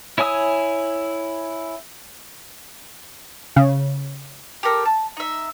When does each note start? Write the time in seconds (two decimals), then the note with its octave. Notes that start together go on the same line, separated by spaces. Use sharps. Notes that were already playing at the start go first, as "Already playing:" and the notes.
0.18 E4 C#5 G#5 D#6 E6
3.56 C#3
4.63 G4 A4 A#4
4.85 A5
5.17 D#4 E5